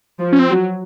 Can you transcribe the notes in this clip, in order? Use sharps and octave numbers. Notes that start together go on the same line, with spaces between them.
F3
C#4
C4
F#3